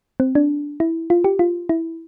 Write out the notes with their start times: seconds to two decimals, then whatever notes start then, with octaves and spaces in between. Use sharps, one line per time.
0.20 C4
0.35 D4
0.80 E4
1.10 F4
1.24 G4
1.39 F4
1.69 E4